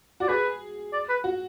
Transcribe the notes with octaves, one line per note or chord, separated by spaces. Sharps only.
F#4 D5
G#4 B4
D5
B4
F#4